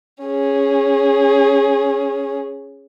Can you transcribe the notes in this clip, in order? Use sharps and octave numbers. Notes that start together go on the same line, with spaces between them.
C#4 G#4